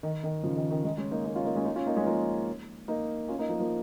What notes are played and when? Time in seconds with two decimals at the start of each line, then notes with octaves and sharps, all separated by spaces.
0.03 D#3
0.24 D#3
0.43 C#3 F3
0.56 D#3
0.71 D#3
0.84 D#3 G#3
0.97 G#3 C#4
1.11 A#3 D#4
1.24 A#3 D#4
1.35 C#4 F4
1.45 A#3 D#4
1.56 G#3 C#4
1.65 A#3 D#4
1.75 C#4 F4
1.86 A#3 D#4
1.96 G#3 C#4
2.06 F3 A#3
2.88 A#3 D#4
3.28 C#4 F4
3.38 A#3 D#4
3.49 F3 A#3
3.59 F3 A#3